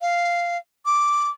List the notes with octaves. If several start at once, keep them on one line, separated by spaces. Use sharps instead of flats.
F5
D6